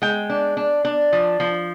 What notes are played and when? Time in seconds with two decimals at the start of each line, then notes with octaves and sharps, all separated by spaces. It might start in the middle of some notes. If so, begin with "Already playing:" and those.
0.02 G#3 G5
0.30 D4
0.57 D4
0.85 D4
1.13 F3
1.40 F3